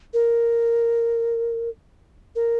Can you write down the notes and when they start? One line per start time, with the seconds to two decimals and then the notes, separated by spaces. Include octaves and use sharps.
0.14 A#4
2.35 A#4